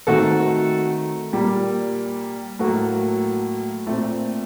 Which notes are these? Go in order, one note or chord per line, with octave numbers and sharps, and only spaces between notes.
D#3 A3 C4 F#4 A4
A#2 G3 A#3
A2 F#3 A#3 F#4 A4
A#2 A3 C4